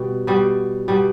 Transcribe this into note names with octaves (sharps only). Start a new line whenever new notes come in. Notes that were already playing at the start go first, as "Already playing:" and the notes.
Already playing: B2 G3
B2 G3
B2 G3